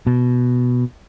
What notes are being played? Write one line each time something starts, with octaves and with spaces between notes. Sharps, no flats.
B2